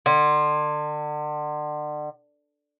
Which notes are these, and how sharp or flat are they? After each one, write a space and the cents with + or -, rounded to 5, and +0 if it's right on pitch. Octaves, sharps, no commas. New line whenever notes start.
D3 +35